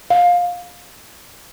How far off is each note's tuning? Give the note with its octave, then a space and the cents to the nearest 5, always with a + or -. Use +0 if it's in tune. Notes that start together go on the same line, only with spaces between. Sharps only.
F5 +20